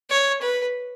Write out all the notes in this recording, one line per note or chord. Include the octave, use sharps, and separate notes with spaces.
C#5
B4